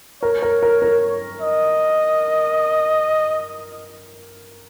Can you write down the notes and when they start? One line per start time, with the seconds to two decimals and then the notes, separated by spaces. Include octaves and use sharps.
0.22 A#4 C#5
0.42 A#4
0.63 A#4
0.82 A#4
1.41 D#5